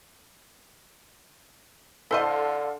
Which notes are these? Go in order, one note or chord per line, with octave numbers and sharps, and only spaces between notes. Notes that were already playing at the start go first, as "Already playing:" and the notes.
D3 E4 A4 C5 D#5 F5 C6